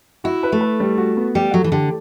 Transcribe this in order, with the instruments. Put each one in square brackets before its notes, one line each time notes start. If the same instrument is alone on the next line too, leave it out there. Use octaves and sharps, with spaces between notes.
[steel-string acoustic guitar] E4 [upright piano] F#4
[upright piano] B4
[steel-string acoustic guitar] A3
[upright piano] B4
G3
F#4
B3
[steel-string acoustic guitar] G3 [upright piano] G4
[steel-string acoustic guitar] F#3 [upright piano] A3
[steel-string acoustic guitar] E3
[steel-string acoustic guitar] D3 [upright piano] G4